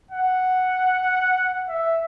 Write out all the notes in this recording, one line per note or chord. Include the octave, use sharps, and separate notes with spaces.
F#5
E5